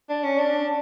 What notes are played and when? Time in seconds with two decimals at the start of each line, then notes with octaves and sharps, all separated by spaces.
0.09 D4
0.24 C#4
0.39 D4